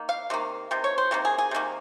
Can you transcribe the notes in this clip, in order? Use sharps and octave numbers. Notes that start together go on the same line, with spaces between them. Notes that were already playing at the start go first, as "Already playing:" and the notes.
Already playing: D#3 A#3
F5
C3 D#3 A#3
C3 D#3
C#5
C5
C3 D#3 A#3
G#4
G#4
C3 D#3 A#3